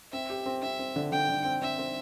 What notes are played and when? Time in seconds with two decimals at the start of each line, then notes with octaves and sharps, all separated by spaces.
0.12 C4 E5
0.30 G4
0.46 C4
0.62 C4 E5
0.79 C4
0.96 D3
1.12 D3 G5
1.29 D3
1.45 C4
1.62 C4 E5
1.79 C4